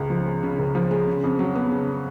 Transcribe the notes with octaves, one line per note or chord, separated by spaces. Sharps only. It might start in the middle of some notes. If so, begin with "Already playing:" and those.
Already playing: C#2 C#3
F3
G#3
C#3
C#2
F3
G#3
C#3
F2
F#3
B3
C#3